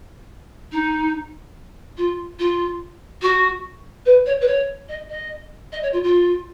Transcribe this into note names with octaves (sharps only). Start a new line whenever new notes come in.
D#4
F4
F4
F#4
B4
C#5
B4
C#5
D#5
D#5
D#5
C#5
F4
F4